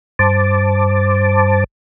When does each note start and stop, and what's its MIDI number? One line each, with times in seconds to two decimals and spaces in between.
0.19 1.64 43
0.19 1.64 72
0.19 1.64 81
0.19 1.64 86